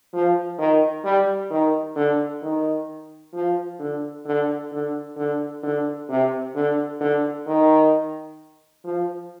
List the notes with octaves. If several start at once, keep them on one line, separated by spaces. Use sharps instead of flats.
F3
D#3
G3
D#3
D3
D#3
F3
D3
D3
D3
D3
D3
C3
D3
D3
D#3
F3